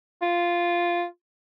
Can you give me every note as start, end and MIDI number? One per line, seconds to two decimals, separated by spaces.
0.22 1.04 65